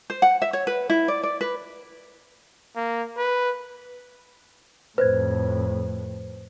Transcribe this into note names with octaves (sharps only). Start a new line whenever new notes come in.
C5
F#5
E5
C#5
B4
E4
D5
D5
B4
A#3
B4
F2 A2 B4 C5 G#6